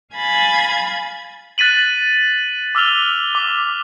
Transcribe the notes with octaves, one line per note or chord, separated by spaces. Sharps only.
F5 G#5 B5 G#6 A6
F#6 A6 B6 D#7 F#7
D6 E6 F6 F7 G7
D6